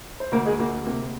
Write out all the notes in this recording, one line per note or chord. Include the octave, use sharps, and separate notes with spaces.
C5
D2 A#3 A#4
G#3 G#4
D2 A#3
C3 A#3